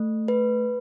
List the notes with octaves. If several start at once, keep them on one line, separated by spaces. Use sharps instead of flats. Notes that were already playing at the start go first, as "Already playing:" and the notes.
Already playing: A3
B4